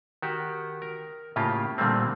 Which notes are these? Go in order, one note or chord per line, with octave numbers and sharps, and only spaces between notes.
D#3 F#4 G4
A#4
A2 C#3 A#3 F4 G4
A#2 D3 G3 A3 A#3 C4